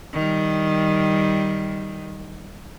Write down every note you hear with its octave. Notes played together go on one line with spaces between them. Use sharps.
D#3 G3